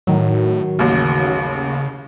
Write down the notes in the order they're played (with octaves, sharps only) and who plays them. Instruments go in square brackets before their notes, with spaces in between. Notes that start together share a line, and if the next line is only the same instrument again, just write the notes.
[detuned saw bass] A2 [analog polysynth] D#3 F#3
[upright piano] A1 D#2 [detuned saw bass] C#3